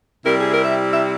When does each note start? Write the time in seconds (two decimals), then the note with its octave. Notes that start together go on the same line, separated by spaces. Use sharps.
0.24 C3 G3 C4 E4 A#4
0.39 G#4
0.51 A#4
0.64 E5
0.91 E5